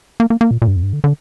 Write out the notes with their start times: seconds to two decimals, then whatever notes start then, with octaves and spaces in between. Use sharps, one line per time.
0.20 A#3
0.30 A#3
0.41 A#3
0.51 A#2
0.62 A#2
0.67 G2
0.76 F2
0.83 G2
0.93 D3
1.04 D3